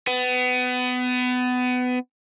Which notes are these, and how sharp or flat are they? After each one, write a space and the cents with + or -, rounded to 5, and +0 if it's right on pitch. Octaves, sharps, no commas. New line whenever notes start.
B3 +25